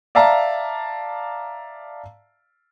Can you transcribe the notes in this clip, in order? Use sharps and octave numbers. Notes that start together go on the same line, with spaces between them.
D5 E5 F5 A5 A#5